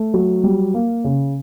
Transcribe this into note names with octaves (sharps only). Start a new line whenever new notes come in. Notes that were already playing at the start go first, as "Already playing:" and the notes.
Already playing: A3
F#3
G3
A#3
C#3